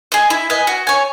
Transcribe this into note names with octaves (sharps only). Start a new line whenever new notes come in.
G#4 D#5
E4
B4 D#5 G#5
F#4
C#5 G#5